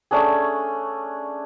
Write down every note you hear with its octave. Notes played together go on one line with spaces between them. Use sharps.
A3 C#4 D4 G#4